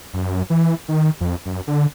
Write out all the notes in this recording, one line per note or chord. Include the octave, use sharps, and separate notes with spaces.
F#2
E3
D#3
F2
F#2
D3